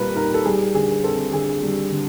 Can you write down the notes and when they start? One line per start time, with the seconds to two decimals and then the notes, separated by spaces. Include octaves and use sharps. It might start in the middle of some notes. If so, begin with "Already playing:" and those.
Already playing: A#2 G3 C4 A#4 B4
0.15 D#4 A#4
0.34 A4
0.45 G3 G#4
0.74 D3 G#4
1.03 C4 A4
1.33 D3 G#4
1.62 G3
1.92 D3